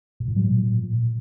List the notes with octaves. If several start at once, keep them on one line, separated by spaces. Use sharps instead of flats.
A#2
A2
F#3
A#2